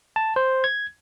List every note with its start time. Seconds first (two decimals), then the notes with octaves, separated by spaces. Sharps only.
0.16 A5
0.36 C5
0.64 G#6